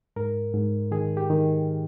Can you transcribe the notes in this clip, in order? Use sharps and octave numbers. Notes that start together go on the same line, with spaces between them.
G#2 A#4
G#2
D#3 G#4
G4
D#3